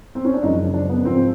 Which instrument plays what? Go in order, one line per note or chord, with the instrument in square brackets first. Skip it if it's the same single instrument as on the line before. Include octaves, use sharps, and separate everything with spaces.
[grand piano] C4
C#4
D4
F#2 C#3 F3 G#3 D#4
D4
B3
G#2 F3 G#3 C4